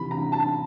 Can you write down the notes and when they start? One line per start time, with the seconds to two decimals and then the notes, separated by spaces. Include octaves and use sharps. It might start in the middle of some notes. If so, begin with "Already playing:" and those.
Already playing: C3 E3 B5
0.11 A#5
0.32 A5